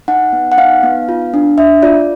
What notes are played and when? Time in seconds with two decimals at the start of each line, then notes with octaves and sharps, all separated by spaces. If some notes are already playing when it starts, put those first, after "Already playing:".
0.08 D#4 F#5
0.33 B3
0.52 F#5
0.57 D#4 F5
0.83 B3
1.09 F4
1.34 D4
1.58 D4 E5
1.82 F4 D5